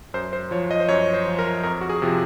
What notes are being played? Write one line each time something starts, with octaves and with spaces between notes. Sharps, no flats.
F#2 C5
C5
F3 C#5
D#5
C5
F#2 C#5
C5
F3
A#4
F2 A#4
F#4
G#4
C3 F3